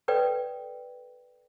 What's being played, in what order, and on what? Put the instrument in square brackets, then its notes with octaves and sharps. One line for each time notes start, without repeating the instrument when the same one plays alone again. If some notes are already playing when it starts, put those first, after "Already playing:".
[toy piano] A4 B4 D5 G5